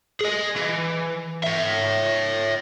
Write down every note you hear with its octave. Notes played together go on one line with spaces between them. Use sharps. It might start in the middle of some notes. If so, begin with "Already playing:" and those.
G#4 D#5
E3
C#5 E5